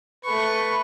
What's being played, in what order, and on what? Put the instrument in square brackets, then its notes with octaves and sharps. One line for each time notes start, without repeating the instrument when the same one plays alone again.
[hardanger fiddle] A3 C#6 [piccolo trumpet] B4